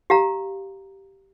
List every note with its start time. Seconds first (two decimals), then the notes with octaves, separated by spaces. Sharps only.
0.10 G4 F5 A#5